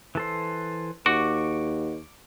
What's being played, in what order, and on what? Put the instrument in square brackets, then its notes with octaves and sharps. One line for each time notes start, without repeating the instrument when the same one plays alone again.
[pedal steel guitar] E3 A4 C5
[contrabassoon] D#2 [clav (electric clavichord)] F#4 [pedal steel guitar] C#6 D6